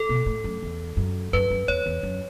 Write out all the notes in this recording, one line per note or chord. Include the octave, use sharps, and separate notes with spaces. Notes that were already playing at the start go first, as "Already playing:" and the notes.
Already playing: A4
B2
A2
F#2
E2
F#2
F#2 B4
F#2
E2 C#5
E2
F#2